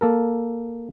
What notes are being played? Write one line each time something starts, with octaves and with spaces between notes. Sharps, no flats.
A#3 A4 A#4